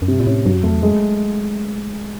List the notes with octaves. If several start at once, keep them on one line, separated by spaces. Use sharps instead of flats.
F#2
G2 C3
A#2
A2 C#4
G2 F#3
F#2
F2 A3
E2
F2 G#3